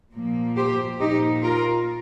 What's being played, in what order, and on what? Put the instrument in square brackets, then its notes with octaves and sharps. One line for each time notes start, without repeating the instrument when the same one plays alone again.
[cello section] A#2 F3 A#3
G4 C5
A#2 A#3 D#4 G4
F4 A#4